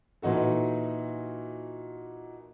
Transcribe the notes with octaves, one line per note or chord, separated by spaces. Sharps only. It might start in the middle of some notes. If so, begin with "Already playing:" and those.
A#2 E3 D#4 F#4 A4